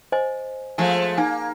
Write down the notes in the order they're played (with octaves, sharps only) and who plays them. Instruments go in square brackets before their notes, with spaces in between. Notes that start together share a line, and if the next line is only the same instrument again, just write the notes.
[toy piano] C5 D#5 G#5
[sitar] F3 G#3 A3 [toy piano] G#5
[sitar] A#3 [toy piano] D#4 G#5